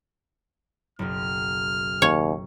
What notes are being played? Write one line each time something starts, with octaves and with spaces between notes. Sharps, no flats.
F#1 B1 F6
D#2 C#5